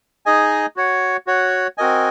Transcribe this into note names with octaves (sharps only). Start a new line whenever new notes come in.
D#4 G#4 D#5 G#5
F#4 C#5 F#5
F#4 C#5 F#5
C4 F#4 A#4 D#5 G#5